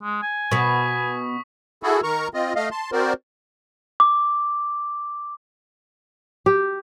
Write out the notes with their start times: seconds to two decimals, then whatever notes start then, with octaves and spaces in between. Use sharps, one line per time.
0.03 G#3
0.23 G#5
0.51 B2 B3 C#6 D#6 B6
1.83 E4 F#4 G#4 A4
2.03 D#3 A#4 A#5 C#6
2.34 C4 F4 D#5
2.56 A3 D#5 F5
2.71 A5 C6
2.92 C4 F#4 A#4 C5 D5
4.00 D6
6.46 G4